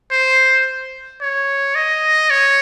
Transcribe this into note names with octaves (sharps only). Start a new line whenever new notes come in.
C5
C#5
D#5
C#5